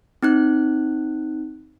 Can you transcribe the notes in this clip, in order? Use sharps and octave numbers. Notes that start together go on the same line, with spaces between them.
C4 D#4 F#6